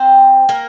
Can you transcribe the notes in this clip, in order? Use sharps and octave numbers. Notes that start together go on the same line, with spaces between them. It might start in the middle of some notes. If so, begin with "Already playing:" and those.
Already playing: C4 C5
A#3 A#4